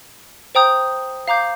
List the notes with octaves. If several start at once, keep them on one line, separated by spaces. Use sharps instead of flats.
C5 G5 A#5 D#6 G6
F5 A#5 D6 G6